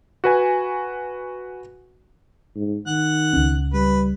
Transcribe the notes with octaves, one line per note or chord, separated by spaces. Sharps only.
F#4 B4 G#5
G#2
D#3 F#5
C#2 C#4
G3 B4